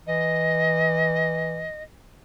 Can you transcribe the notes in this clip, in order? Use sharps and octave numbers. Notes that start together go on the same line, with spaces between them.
E3 D#5